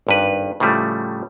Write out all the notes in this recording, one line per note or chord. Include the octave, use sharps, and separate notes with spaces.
G#1 G2 B4
A2 C#3 F3 G3 A3